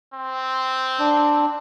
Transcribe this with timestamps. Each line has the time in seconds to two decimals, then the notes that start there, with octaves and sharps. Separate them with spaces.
0.14 C4
0.99 D4